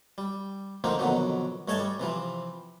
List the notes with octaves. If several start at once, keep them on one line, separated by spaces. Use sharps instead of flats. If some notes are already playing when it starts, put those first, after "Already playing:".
G3
D3 F3 A#3 C4 D#4
F2 B2 D3 D#3 F#3
G2 A3 C#5 D#5 G#5 A5
G3
C3 E3 F3